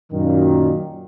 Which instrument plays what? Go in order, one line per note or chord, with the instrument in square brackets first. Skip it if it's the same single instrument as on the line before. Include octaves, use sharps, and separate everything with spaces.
[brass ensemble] F#2 A#2 D#3